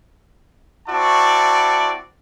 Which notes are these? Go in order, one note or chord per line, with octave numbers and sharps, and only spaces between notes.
C4 E4 F#4 D5 A5 C#6